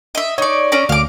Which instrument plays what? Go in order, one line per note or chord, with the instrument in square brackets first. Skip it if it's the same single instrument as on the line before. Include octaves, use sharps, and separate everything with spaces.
[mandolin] D#5 E5
[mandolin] D#4 D5 [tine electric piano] C#5 C#6
[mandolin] C#4 D5 A#5
[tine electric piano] D2 [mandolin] F5 D6